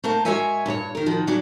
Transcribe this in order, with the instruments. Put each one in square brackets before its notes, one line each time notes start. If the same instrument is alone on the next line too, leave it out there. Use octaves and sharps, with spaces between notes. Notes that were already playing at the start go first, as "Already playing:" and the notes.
[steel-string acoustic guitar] A3 A#3 A#4 C5 A5
G#3 F#4 A#4 C#5 E5 G#5
G2 A#2 G4 C#5
D#3 A#4
D#3 F3 F#4
C#3 F#3 D4 F#4